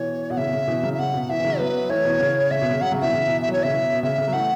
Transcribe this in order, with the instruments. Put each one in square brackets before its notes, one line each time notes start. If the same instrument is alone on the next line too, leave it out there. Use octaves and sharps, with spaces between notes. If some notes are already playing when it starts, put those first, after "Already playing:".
Already playing: [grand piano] B2 E3 [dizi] C#5
[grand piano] B2 [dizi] F#5
[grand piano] C#3 [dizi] E5
[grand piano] B2
C#3
B2 E3
C#3 F#3
[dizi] E5
[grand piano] C#3 [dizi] F#5
[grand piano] B2
[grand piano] B2 E3 [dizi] E5
[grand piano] E3
C#3 F#3
[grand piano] F#3 B3 [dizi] B4
[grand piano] E3 A3 [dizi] C#5
[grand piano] B2 E3
C#3
[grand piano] C#3 [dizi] E5
[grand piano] B2
C#3
[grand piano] C#3 F#3 [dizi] F#5
[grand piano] C#3 F#3
[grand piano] B2 E3 [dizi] E5
[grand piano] C#3
B2 E3
[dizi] E5
[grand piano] F#3
[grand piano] E3 [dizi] C#5
[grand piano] C#3 [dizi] E5
[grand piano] B2
B2
[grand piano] C#3 [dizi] E5
[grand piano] C#3
F#3
[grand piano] E3 A3 [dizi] F#5